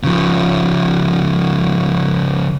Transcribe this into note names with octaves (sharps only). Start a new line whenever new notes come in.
C#3 F3